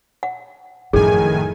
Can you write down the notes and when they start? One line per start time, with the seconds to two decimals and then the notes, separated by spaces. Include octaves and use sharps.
0.23 F#5
0.93 F#2 A2 D#3 F3 G#4 G#5